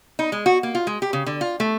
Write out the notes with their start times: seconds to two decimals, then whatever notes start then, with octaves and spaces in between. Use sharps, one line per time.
0.19 D#4
0.32 G#3
0.46 F#4
0.63 A#3
0.75 F4
0.87 G#3
1.02 G4
1.13 C#3
1.26 D3
1.41 F4
1.60 A3